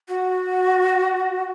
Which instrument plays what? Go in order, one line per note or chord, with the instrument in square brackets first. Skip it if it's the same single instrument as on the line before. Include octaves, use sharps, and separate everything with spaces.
[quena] F#4